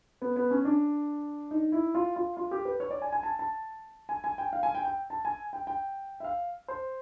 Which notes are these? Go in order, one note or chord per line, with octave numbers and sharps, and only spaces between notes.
B3
B3
C#4
D4
D#4
E4
F4
F4
F4
G4
B4
C#5
D5
G#5
G#5
A5
A5
G#5
G#5
G5
F5
G#5
G5
G5
A5
G#5
G5
G5
E5
F5
C5